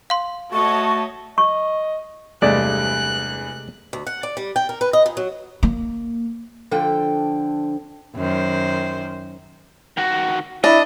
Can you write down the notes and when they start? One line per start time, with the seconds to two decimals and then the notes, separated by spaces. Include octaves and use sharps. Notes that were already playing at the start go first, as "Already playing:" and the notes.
0.10 F5 C6
0.53 A3 F#4 C#5 D#5 A5 C#6
1.38 D#5 C#6
2.42 E2 G2 C3 G#3 A3 D5 F#6
3.93 D2
4.07 F#5
4.23 D5
4.37 G3
4.56 G5
4.69 A#4
4.81 B4
4.93 D#5
5.06 A#2
5.17 F#3
5.63 A#3
6.71 D3 F3 D4 A4 G5
8.16 F#2 D#3 C5
9.97 D#3 F#4
10.64 D4 E4 D#5